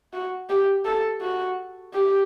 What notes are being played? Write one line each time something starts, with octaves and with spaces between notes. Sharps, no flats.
F#4
G4
A4
F#4
G4